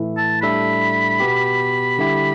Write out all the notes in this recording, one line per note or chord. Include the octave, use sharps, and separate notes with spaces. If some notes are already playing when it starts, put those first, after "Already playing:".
Already playing: A2 E3 A3 E4
A5
A2 G3 D4 A4 E5 B5
B2 B3 G4
D3 G3 E4 G4